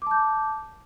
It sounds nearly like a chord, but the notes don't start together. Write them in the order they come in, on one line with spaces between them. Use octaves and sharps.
D6 A5 G6